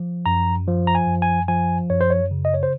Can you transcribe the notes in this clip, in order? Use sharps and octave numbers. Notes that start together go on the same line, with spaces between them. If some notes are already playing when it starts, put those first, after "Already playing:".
Already playing: F3
F#2 A#5
F3
A#5
G#5
F#2
G#5
F3 G#5
F#2 C#5
C5
C#5
C#3
D#5
C#5
C5